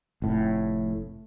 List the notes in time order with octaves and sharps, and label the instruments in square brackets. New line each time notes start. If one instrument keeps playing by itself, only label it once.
[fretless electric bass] F1 A2